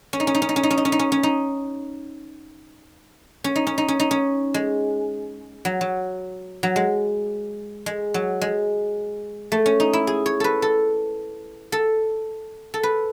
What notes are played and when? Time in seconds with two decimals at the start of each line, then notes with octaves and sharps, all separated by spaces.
0.13 C#4
0.20 D#4
0.27 C#4
0.35 D#4
0.42 C#4
0.49 D#4
0.56 C#4
0.63 D#4
0.71 C#4
0.77 D#4
0.85 C#4
0.92 D#4
0.99 C#4
1.12 C#4
1.23 D#4
3.44 C#4
3.56 D#4
3.67 C#4
3.78 D#4
3.88 C#4
4.00 D#4
4.11 C#4
4.54 G#3
5.65 F#3
5.81 F#3
6.63 F#3
6.76 G#3
7.86 G#3
8.14 F#3
8.41 G#3
9.52 A3
9.66 C#4
9.80 D#4
9.93 E4
10.07 G#4
10.26 C#5
10.40 A4 B4
10.62 A4
11.72 A4
12.74 A4
12.83 B4